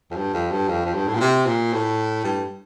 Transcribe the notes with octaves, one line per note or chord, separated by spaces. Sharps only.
F2
G2
F2
G2
F2
F2
G2
A2
A#2
C3
A#2
A2
G2